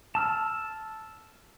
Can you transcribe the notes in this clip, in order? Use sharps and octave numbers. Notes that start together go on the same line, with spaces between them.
A5 E6 F6